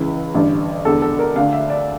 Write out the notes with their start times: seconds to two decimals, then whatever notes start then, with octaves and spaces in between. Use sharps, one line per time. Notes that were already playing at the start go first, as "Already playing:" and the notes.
Already playing: C#2 C#3 E3
0.35 A1 G2 D3
0.85 E1 E2 D3 A4
1.02 A4
1.19 A#4
1.36 D2 D3 F5
1.53 E5
1.70 D5